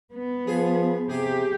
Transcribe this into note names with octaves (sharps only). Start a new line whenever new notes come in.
B3
F3 G#4
C3 G4 G#4